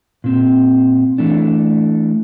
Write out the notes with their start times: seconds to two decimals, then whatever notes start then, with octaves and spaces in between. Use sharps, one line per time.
0.24 A#2 C4
1.18 E3 A3 D4